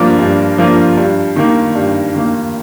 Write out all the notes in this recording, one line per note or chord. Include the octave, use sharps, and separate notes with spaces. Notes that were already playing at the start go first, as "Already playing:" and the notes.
Already playing: G2 F3 A#3 D4 F4
G2
F3 A#3 D4 F4
G2
D#3 A#3
G2
D#3 A#3